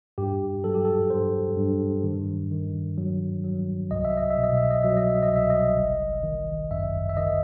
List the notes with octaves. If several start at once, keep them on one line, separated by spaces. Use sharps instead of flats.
G2 G4
F#3 A4
G4
A4
G2 C5
G2
D#3
D#3
F#3
F#3
C2 D#5
E5
D#5
E5
B2
D#5
E5
D#5
F#3 E5
D#5
E5
D#5
C2 E5
D#5
G1
D#3
F#2 E5
E5
D#3 D#5